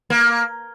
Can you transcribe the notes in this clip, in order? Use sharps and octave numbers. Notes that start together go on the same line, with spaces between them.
A#3